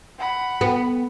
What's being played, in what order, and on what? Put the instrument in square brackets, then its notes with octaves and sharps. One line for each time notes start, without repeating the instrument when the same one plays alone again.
[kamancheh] F#5 B5
[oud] B3